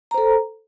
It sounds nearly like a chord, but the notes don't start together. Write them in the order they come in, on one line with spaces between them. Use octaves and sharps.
A#5 C5 A4